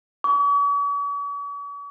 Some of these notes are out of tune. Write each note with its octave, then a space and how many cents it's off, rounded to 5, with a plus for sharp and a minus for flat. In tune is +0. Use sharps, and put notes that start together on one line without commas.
C#6 +45